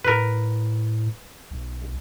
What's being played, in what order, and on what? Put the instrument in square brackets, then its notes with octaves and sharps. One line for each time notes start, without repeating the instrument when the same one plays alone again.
[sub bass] A2 [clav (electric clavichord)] A#4 B4
[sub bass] B1